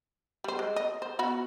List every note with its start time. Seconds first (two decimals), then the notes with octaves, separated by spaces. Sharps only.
0.44 G3 C5
0.59 G#3
0.76 D#5
1.02 C5
1.19 B3 F#4 B5